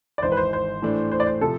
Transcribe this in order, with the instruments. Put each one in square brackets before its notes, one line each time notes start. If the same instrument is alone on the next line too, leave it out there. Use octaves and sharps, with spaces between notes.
[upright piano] D5
[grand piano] G#1 G#2 E3 [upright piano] C5
[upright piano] B4
C5
C5
[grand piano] A2 E3 A3 D4
[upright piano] C5
D5
C5
[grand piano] C3 F3 [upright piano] A4